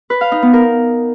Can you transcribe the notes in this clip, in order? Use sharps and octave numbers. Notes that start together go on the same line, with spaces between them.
B4
F5
D#4
B3
A#4